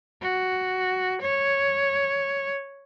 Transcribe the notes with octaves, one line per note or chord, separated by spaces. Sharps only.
F#4
C#5